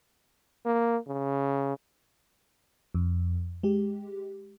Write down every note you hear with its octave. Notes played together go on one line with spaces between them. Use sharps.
A#3
C#3
F2
G#3 G4